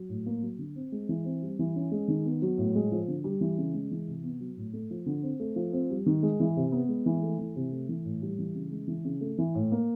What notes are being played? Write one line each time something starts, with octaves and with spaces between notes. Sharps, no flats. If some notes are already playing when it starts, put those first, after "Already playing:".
Already playing: F#3
A2
A#3
F#3
D3
C4
G#3
E3
C4
G3
E3
C#4
G#3
D#3
B3
F#3
A2
G#3
F3
D3
G3
E3
C#3
G#3
E3
C3
B3
F#3
A2
A3
F3
D3
C4
A3
F3
C4
G3
D#3
G#3
E3
C3
B3
G#3
E3
A3
E3
C3
A3
E3
A2
G3
E3
C#3
G#3
E3
C#3
A3
E3
A2
A#3